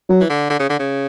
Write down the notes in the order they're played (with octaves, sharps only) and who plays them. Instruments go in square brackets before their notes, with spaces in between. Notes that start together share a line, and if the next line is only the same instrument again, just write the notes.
[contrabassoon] F#3
[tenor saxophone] E3
D3
D3
C#3
D3
C#3